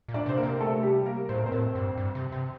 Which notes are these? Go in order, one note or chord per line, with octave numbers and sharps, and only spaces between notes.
A#2
D4 D5
C3 C5
A#3 A#4
C3
A3 A4
G3 G4
A#3 A#4
A2 C5
A#4
C4 C5
A2
G2
G2
C3
C3